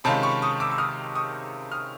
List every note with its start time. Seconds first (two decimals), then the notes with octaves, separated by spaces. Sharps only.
0.04 C3 D#3 G#3 C#4 F4 A5 B5
0.23 B5 C#6
0.42 C#6 D#6
0.60 D6 E6
0.71 E6
0.78 D#6 F6
1.15 C#6 D#6
1.72 D#6 F6